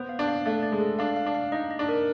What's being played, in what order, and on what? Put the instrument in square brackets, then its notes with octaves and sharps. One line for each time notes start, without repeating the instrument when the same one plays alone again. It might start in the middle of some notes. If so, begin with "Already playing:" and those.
Already playing: [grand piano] B3 [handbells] C5
[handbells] F5
[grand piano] D4
[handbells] F5
[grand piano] A3 [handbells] D5
[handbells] D5
[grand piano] G#3
[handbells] A4
[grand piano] D4 [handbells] F5
[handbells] F5
[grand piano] D4
[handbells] F5
[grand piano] D#4 [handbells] D#5
[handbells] D#5
[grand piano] D4
[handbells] A#4